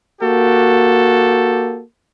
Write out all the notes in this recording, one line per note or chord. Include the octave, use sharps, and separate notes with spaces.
A#3 F#4 G4 A4